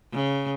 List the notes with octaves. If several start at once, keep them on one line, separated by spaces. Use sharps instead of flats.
C#3